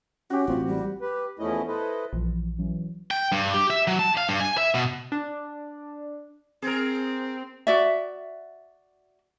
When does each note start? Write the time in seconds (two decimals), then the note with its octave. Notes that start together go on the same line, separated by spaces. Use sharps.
0.30 C#4 F#4 G4
0.48 A1 C4 F4
0.67 G3
1.01 G4 B4
1.39 E2 F3 A3 C#4 E4 D#5
1.68 E4 A4 B4 C5 D#5
2.13 A#1 E3 F3
2.58 E3 F#3 C#4
3.11 G5
3.32 G2
3.54 G4
3.70 E5
3.87 F#3
3.99 A5
4.17 F5
4.29 G2
4.40 G#5
4.58 E5
4.74 B2
5.12 D4
6.62 C4 G#4 A#4
7.67 F#4 D5 E5